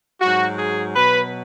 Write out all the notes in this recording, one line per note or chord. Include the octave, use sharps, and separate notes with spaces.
G#2 F#3 F#4
G#4
B2 F#3 B4